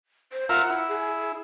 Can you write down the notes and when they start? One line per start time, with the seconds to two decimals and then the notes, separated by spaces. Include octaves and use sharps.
0.32 C5
0.49 F4 A#4 E5 F#5
0.70 E4
0.89 G#4